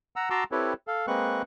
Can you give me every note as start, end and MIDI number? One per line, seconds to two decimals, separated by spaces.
0.16 0.29 78
0.16 0.29 82
0.16 0.29 88
0.30 0.44 66
0.30 0.44 81
0.30 0.44 82
0.30 0.44 84
0.30 0.44 86
0.30 0.44 88
0.52 0.73 60
0.52 0.73 64
0.52 0.73 67
0.52 0.73 69
0.52 0.73 71
0.52 0.73 73
0.87 1.06 69
0.87 1.06 77
1.07 1.42 56
1.07 1.42 58
1.07 1.42 60
1.07 1.42 71
1.07 1.42 85
1.07 1.42 90